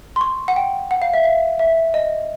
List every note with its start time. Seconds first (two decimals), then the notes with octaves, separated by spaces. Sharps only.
0.16 C6
0.21 C#6
0.48 F#5
0.56 G5
0.91 F#5
1.02 F5
1.13 E5
1.24 F5
1.59 E5
1.94 D#5